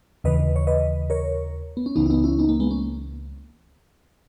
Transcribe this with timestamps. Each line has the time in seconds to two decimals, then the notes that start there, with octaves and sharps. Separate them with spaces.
0.24 D#2 C#3 E3 B4 D#5
0.56 C#5
0.67 B4 D#5
1.10 A#4 C#5
1.77 B3
1.86 C#4
1.96 C#2 C#3 E3 B3 D#4
2.06 E4
2.10 B3 D#4
2.24 C#4 E4
2.39 B3 D#4
2.49 A#3
2.60 G#3 B3
2.71 A#3 C#4